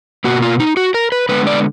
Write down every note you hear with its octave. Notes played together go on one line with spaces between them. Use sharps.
B2 A#3 F#4
F4
D#4
F#4
A#4
B4
D3 G#3 B3 B4
D5